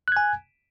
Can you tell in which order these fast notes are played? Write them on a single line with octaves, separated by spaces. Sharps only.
F#6 G#6 G#5